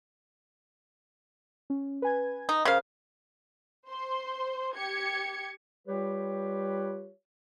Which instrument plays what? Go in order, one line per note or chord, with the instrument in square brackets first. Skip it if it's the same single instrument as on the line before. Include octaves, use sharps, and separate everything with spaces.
[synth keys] C#4
B4 G#5 G#6
[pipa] D#4
[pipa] C#3 F5 [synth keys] A#4 C5 D#6
[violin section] C5 C6
G4 G#6 C#7
[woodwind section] G3 F4 G4 B4 C#5